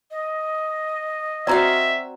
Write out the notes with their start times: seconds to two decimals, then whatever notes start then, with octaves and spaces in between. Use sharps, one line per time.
0.11 D#5
1.47 C4 F#4 D5 E5 F5 A#5